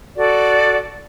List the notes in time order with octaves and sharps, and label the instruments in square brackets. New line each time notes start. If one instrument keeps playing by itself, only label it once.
[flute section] F#4 A4 D5